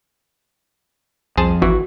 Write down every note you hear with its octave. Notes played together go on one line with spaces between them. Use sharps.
C2 F2 G#4 C5 A5
G#1 E3 F#4